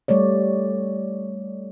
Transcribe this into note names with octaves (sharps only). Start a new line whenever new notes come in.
G3 A3 C#5 D5